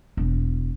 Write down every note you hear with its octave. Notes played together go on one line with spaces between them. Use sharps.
E1